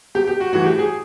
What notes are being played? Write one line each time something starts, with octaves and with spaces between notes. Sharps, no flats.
B2 G4
G4
F#4
A2 E3 F#4
G4
G#4